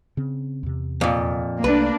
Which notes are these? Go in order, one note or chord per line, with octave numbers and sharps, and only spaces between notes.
C#3 C4
E2 C3
F2 A#2
C2 G3 A3 A#3 D4 B4